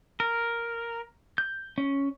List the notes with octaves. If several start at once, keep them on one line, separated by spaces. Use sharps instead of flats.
A#4
G6
C#4